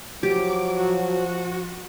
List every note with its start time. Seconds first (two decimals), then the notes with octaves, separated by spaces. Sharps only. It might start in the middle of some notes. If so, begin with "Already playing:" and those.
0.23 F3 F#3 G4 D6
0.76 F#4